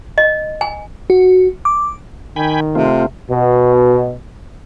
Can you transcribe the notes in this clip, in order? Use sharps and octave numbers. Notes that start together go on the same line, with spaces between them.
D#5
G#5
F#4
D6
D#3 G5 G#5 B5
C3 A3 C4 F4
B2